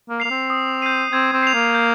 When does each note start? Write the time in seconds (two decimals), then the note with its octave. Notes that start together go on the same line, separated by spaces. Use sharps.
0.09 A#3
0.20 A#3 C7 F7
0.30 C4
0.50 D#6
0.82 G6 C7 D#7
1.12 C4 G#6
1.33 C4
1.43 C7 F7
1.54 A#3
1.75 G6